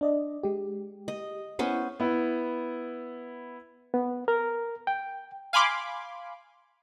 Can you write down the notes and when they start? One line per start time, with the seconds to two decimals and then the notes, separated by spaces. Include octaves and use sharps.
0.01 D4 D5 D#5
0.43 G#3 G4
1.08 D#5
1.59 B3 C#4 E4 C5
2.00 B3 E4
3.94 B3
4.28 A#4
4.87 G5
5.53 F5 G#5 B5 C6 D6